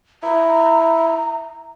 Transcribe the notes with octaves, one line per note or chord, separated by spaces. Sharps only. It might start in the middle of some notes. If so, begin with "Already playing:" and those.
E4 A#5